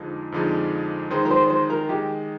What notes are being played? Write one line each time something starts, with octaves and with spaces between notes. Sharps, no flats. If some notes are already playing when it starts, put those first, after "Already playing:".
Already playing: F2 D3 F3 G#3 D#4
F2 D3 F3 G#3 D#4
D#3 G#3 D#4 C5
A#4
C5
C5
A#4
D#3 G#3 D#4 G4